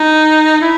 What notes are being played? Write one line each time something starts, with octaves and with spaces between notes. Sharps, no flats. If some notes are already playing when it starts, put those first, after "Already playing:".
Already playing: D#4
E4